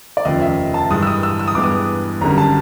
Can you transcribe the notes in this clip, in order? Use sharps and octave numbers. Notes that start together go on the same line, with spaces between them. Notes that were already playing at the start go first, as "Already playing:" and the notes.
D5
F1 D#2 C#3 F3 D#5
E5
A5
G2 E3 G#3 D#6
E6
D#6
E6
E6
D#6
G2 E3 G#3 B3 D6
D#6
G#1 F#2 D3 G3 A#5
A5